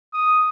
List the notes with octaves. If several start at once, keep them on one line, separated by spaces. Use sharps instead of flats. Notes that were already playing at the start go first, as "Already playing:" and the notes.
D#6